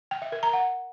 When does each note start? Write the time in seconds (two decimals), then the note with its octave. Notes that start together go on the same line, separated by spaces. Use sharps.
0.11 G5
0.22 E5
0.32 A#4
0.43 A#5
0.53 F#5